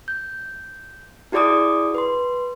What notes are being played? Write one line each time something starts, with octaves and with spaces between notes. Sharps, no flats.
G6
E4 F#4 G#4 D5 D6 D#6
B4 C6